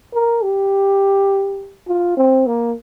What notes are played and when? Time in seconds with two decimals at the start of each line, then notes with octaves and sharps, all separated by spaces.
0.14 A#4
0.43 G4
1.88 F4
2.17 C4
2.47 A#3